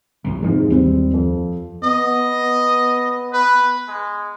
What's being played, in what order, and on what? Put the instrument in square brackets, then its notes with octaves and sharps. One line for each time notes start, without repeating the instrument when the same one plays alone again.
[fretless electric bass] G1 C2 F#2
[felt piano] E2 G#2 C3 [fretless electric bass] F3 G#3
[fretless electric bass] D#2 [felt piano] G3 C4
[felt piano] F2
[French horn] B3 [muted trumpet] D#5
[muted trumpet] B4
G#3